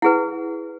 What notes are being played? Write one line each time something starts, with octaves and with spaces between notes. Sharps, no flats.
E4 G#4 B4 F#5